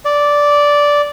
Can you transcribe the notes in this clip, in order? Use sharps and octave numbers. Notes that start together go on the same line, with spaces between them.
D5